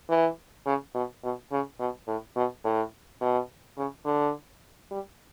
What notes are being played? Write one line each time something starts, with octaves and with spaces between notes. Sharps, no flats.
E3
C#3
B2
B2
C#3
B2
A2
B2
A2
B2
C#3
D3
G3